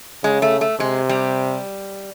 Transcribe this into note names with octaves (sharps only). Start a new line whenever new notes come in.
C#3 G#3
A3
A3
C3 G#3
G3